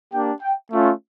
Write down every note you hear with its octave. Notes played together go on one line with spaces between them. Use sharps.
A#3 D4 G4 G5
G5
A3 C#4 F4